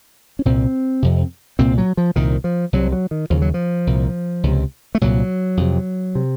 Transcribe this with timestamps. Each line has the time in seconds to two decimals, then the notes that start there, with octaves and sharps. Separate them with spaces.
0.39 C#4
0.45 C2 A#2 C4
1.02 F2 C3
1.59 C2 A#2 C4
1.78 F#3
1.97 F3
2.16 C2 A#2 D#3
2.44 F3
2.73 C2 C3 F#3
2.92 F#3
3.11 D#3
3.30 D#2 C#3 F3
3.42 F#3
3.54 F3
3.87 C2 A#2
4.43 C#2 C3
4.95 A3
5.01 C2 A#2 F#3
5.57 F2 C3
6.15 C3